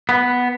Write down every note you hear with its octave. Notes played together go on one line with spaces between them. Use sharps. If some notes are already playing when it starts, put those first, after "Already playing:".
B3